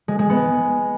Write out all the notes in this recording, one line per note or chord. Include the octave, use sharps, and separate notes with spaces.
G#3
G#3
B3